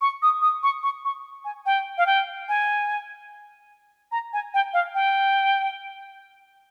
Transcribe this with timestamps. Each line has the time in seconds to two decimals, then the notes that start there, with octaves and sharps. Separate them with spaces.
0.01 C#6
0.22 D#6
0.42 D#6
0.63 C#6
0.83 C#6
1.05 C#6
1.45 G#5
1.66 G5
1.98 F5
2.06 G5
2.49 G#5
4.12 A#5
4.33 G#5
4.54 G5
4.74 F5
4.95 G5